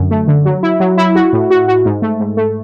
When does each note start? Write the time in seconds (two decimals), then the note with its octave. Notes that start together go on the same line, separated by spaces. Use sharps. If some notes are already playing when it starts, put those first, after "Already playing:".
Already playing: F#2 D3
0.11 A3
0.28 D3
0.45 F#3
0.63 E4
0.80 F#3
0.98 E4
1.15 F#4
1.33 A2
1.50 F#4
1.68 F#4
1.85 G#2
2.02 A3
2.20 G#2
2.37 A3